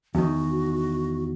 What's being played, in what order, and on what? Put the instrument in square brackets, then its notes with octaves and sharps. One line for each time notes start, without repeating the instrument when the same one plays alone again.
[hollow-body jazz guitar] E2 D#3 [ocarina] F#4